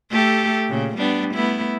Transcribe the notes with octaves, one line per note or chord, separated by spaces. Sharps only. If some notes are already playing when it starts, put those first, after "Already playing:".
A3 G4 A4
A#2 C#3
G3 B3 D4
A3 B3 E4